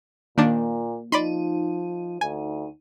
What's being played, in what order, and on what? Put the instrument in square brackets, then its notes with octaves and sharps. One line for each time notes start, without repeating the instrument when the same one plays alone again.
[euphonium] A#2 [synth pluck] D#3 D4 [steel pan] A#3
[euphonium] F3 [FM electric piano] D#4 [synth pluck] D5 B5 C6
[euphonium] D2 [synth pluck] G#5